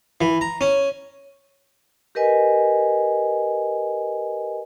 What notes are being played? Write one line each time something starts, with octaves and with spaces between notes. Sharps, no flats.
E3
A#5
C#4
G4 A#4 B4 D#5 G#5